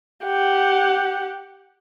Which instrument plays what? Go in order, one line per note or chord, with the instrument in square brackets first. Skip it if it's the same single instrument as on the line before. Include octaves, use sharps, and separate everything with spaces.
[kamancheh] G4 F#5